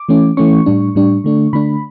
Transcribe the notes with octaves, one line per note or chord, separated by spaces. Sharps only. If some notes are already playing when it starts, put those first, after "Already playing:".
Already playing: D6
E3 A3 C#4
E3 A3 C#4 C#6
A2 G3 D4
A2 G3 D4
D3 A3 D4
D3 A3 D4 B5